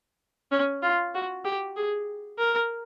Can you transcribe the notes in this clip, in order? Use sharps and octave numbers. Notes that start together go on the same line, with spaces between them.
C#4
F4
F#4
G4
G#4
A#4